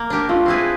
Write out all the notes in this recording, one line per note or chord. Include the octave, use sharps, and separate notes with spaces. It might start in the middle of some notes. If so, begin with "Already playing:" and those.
Already playing: A#3
D4 G4 A#4
A3 F4
C4 E4 G#4 B4